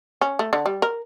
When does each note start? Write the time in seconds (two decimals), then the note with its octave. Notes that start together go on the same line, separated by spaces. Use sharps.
0.21 C#4
0.39 A3
0.53 D3
0.66 G3
0.82 A#4